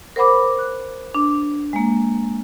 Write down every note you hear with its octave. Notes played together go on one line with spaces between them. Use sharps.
A#4 C5 F#5 B5 D6
F#6
D4
G#3 A#3